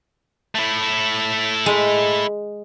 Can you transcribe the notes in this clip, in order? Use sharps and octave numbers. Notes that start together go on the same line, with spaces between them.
A3 E4
G#3